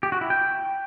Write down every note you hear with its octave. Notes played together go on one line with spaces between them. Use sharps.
G4
F#4
E4
G5